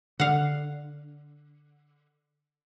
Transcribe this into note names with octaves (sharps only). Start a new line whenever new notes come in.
D3 F5 F#5